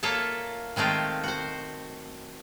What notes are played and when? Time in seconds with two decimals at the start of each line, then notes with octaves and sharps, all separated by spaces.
0.03 A#3 F4 A4 C#5 E5 A5
0.76 D#3 G#3 A3 C4 F4
1.24 F#4 C5